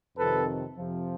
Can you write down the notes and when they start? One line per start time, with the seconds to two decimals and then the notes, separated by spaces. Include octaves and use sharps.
0.17 F2 C3 D#3 A4 B4
0.76 F2 C3 F3